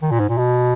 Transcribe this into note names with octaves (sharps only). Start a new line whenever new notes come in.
D#3
A#2
G#2
A#2
B2